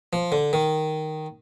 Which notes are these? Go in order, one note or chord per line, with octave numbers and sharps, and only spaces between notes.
F3
D3
D#3